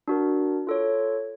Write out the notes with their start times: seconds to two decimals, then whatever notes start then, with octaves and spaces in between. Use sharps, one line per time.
0.08 D4 F#4 A#4
0.67 F4 A4 C#5